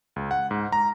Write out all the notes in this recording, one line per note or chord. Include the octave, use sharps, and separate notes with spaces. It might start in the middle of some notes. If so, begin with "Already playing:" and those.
C#2
F#5
G#2
A#5